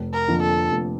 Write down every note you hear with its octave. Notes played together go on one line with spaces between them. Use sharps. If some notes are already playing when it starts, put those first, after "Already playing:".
Already playing: F1
A#4
F2 D3 F3 A#3
A4
F1